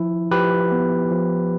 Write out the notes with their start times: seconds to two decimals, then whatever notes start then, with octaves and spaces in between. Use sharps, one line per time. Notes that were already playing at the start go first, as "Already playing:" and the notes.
Already playing: F3 E4
0.31 F3 G4 B4
0.72 B3
1.11 F3